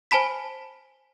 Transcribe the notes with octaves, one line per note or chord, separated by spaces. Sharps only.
C5 G#5 A5 B5 B6